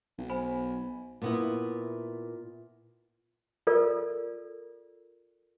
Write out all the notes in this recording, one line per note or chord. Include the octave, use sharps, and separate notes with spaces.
B1
C5 G#5 B5
A#2 B3 E4
F4 A4 A#4 D5